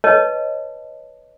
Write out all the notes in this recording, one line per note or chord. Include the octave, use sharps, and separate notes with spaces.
B4 C#5 D#5 A5